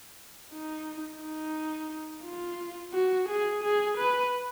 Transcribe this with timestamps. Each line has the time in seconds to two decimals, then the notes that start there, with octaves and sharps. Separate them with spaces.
0.52 D#4
1.22 D#4
2.25 F4
2.94 F#4
3.29 G#4
3.63 G#4
3.97 B4